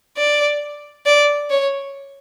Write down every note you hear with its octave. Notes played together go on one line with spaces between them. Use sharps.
D5
D5
C#5